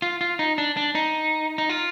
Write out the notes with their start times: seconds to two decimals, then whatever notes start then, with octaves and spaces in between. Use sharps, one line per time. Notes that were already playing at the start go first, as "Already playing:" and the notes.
0.02 F4
0.21 F4
0.39 D#4
0.58 D4
0.77 D4
0.95 D#4
1.58 D#4
1.69 F4